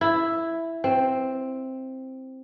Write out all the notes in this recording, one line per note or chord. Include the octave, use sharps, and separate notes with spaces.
E4
C4